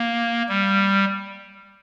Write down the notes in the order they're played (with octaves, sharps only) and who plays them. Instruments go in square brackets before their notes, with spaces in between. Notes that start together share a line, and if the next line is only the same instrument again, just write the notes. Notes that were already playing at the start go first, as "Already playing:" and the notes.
Already playing: [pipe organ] A#3
G3